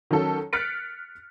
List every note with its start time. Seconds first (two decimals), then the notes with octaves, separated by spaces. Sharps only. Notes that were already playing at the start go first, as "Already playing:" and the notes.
0.11 D#3 F#3 C#4 A4
0.53 F6 F#6 A6 B6 C#7 D7